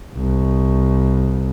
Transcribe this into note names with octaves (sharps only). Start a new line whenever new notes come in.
C2